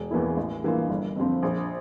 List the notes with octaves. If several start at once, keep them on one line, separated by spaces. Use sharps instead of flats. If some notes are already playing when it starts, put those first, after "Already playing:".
Already playing: E1
E2 E3 A#3 E4
A1
G2 E3 A#3 F4
G1
F2 D3 F3 C4
A#1